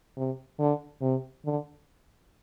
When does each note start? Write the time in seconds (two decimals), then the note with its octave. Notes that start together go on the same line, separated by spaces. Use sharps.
0.17 C3
0.59 D3
1.02 C3
1.45 D3